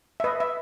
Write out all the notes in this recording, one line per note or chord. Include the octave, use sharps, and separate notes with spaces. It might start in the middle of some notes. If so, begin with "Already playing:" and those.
E5
B4 D#5
E5